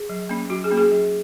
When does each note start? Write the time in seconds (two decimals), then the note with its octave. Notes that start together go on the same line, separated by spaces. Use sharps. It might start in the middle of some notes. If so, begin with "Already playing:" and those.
Already playing: G#4
0.10 F#3
0.29 A#3 C#4
0.50 F#3 F#4
0.64 G#4
0.71 A#3 C#4
0.77 G#4
0.92 F#3